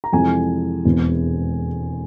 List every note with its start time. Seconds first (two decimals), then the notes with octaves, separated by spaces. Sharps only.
0.04 A#5
0.13 F2 C3 E3 G#3 G#5
0.85 E1 E2 E3 G#3 C4